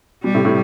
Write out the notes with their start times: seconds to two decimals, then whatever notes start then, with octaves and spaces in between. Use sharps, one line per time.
0.24 B2 G3
0.35 A2 C3
0.45 A2 C3